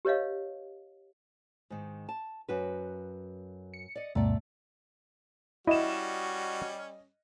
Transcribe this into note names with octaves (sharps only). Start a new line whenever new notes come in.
G4 B4 C#5 D#5 F5
G#2 D#3
A5
F#2 F#4 B4
C#7
D5 D#5
D2 G2 B2 A3 D5
G3 C#4 E4 F#4 D#5 E7